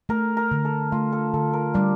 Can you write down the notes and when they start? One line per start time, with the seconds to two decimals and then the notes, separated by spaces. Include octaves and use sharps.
0.09 A3 A#4
0.37 A#4
0.51 D3
0.65 A4
0.92 A3 F4
1.12 A4
1.34 D3 A4
1.53 A#4
1.74 G3 D4